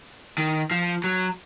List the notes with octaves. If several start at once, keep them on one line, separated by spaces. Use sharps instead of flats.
D#3
F3
F#3